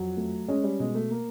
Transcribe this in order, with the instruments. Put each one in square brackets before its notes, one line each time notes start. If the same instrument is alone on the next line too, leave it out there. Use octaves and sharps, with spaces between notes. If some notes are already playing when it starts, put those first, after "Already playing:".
Already playing: [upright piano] F2 [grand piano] F#3
[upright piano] A3
[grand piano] G#3 [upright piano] C#4
[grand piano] G3
[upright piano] B2 [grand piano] G#3
[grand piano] A3
A#3